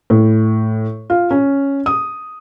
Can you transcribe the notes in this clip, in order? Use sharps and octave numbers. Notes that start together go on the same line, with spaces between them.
A2
F4
C#4
D#6